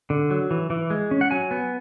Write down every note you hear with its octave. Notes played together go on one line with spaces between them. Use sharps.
D3
F#3
E3
E3
G#3
C#4
F#5
F#3 G#5
B3